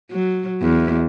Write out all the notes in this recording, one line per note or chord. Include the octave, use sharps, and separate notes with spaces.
F#3
E2